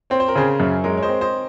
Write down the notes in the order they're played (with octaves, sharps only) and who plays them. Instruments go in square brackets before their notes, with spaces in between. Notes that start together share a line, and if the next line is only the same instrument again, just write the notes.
[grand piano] C4 [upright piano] C#5
[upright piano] C5
A#4
[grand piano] C#3 [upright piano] G#4 C5
[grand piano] F#2
[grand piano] G#3 [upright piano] A#4 C#5
[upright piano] C#5
C5 D#5
[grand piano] C4
[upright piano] C5 D#5